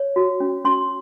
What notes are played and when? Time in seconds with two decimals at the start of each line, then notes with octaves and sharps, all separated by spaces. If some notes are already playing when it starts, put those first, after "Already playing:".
Already playing: C#5
0.16 F#4
0.40 C#4
0.65 C#4 C6